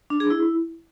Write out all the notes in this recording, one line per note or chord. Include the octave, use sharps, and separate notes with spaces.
D4
G#4
E4